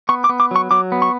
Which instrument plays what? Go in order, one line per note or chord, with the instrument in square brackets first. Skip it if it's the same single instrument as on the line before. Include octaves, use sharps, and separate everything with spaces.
[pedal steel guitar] B3 C#6
D6
B3
D6
F#3 C#6
F#3 D6
B3
C#6